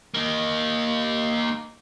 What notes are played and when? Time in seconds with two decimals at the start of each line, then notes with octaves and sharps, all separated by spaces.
0.14 A#3 D#4